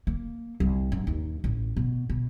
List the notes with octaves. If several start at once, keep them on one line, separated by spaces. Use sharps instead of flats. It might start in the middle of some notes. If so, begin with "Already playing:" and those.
A#3
C2
F#2
D#2
A1
B2
B2